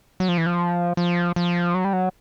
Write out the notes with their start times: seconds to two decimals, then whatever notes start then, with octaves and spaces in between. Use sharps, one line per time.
0.20 F#3
0.29 F3
0.38 E3
0.46 F3
0.97 F3
1.36 F3
1.74 F#3
1.85 G3
1.93 F#3